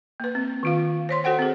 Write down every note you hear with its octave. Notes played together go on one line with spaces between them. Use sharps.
A#3 B4
C4
D#3 F4 F5
C5 C#5 C6
F#4 A4 C5 F#5 G5
C4 G#4